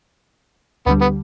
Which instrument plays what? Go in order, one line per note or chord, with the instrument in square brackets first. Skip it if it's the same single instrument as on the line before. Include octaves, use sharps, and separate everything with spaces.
[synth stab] D2 D3 G3 [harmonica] B3
[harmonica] B3